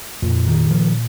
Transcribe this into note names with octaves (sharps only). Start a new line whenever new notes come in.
F2 A#2
D#3
F3